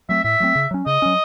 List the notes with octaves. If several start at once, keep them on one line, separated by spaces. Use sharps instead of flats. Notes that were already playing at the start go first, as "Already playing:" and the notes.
F#3 A3 C4 E5
A2 E5
F#3 A3 C4
C#3
F#3 C#4
C#3 D#5
F#3 C#4